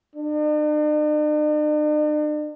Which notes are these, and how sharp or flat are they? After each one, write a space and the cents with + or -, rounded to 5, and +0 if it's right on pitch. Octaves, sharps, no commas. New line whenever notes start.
D4 +45